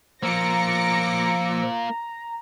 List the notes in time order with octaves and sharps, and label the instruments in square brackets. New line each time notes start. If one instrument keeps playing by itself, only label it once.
[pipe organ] F3 E6 [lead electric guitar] A#3 F4 [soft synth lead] A#5 [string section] D6 A#6 C#7